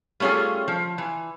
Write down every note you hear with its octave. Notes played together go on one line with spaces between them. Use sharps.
G3 A3 C#4 F4 G#4
F3
E3